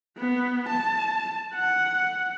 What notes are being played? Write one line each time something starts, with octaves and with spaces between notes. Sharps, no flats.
B3
A5
F#5